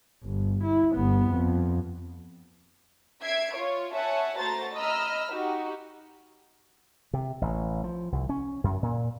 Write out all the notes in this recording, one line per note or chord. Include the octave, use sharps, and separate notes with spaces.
G1
E4
G1 B3
F2
E5 G#6 C7 D7
F4 C#5
C#5 E5 F#5 G#5 A5
A3 F#4 C5 A5 A#5 A6
D#5 A#5 B5 E6 F6
D#4 F#4 G4
C3
A1
F3
C2
C#4
F#2
A#2